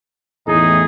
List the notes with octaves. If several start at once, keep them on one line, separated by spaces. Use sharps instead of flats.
E2 A2 D#4 G#4